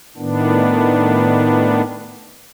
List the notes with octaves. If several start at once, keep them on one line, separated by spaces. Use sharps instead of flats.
A2 D#3 B3 D4